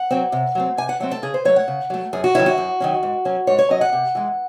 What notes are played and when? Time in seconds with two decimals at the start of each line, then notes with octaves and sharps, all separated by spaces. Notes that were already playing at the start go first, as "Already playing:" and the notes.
Already playing: F#5
0.11 F#3 C4
0.32 C3
0.55 F#3 A3 C4
0.77 C3 G#5
0.89 F#5
1.00 F#3 A3 C4 F#5
1.11 A4
1.22 C#3 G#4
1.34 C5
1.45 F#3 A3 C#5
1.56 F#5
1.68 C#3
1.90 F#3 A3
2.13 F#2 G#4
2.24 F#4
2.35 D#3 F#3 C#4 E4
2.46 F#4
2.58 F#2
2.80 D#3 F#3 C#4
3.03 G#2
3.25 F#3 C#4
3.47 G#2 C#5
3.59 C#5
3.70 F#3 C#4 D#5
3.81 F#5
3.93 C3
4.15 E3 G#3